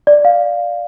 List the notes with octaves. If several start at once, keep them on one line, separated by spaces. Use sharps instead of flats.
D5
F5